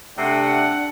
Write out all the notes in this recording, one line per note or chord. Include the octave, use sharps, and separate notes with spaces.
C3 A3 D4 F#5